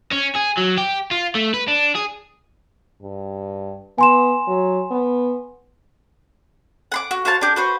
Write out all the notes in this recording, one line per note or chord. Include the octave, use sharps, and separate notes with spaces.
C#4
G#4
F#3
G4
F4
A3
B4
D4
G#4
G2
B3 G#5 C6 E7
F#3
B3
F#5 C6 D6
F#4
F#4 C5 F5 A5
D4 G4
F#4 B4 C5